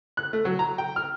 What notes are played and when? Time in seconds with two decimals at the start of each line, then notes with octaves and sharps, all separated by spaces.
0.17 F#6
0.33 A3
0.45 F#3
0.59 A#5
0.78 G5
0.96 F6